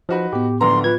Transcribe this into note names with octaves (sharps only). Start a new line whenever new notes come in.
F3 D#4 F#4 B4
A2 B3 G4
D1 A#1 D3 B4 A#5 C6
F4 B4 G#6